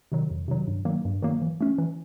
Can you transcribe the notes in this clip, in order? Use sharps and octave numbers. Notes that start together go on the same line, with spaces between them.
C3 D#3 F#3
F2
C3 D#3 F#3
G2
D#3 F#3 A#3
G2
D#3 F#3 A#3
E3
A3 C#4
E3